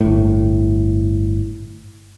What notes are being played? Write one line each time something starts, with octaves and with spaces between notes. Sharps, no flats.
G1 A2